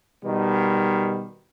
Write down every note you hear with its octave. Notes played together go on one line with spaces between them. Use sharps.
B2 D#3 G3